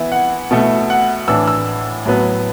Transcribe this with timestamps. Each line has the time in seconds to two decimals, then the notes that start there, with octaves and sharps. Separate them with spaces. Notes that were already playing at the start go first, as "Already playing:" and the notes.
Already playing: E3 B3 E4
0.12 F#5
0.51 B2 A3 E4
0.90 F#5
1.28 A2 E3 D4 E6
1.47 E6
2.05 A2 F#3 B3